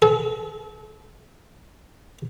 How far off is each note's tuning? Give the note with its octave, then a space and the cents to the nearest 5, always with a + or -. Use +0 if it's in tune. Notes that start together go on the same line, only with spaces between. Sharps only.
A4 -35